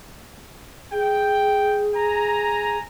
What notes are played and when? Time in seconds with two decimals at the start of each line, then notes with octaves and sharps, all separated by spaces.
0.92 G#4 G5
1.95 G#5 A#5